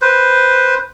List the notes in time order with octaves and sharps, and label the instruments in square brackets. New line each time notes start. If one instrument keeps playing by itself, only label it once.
[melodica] B4 C5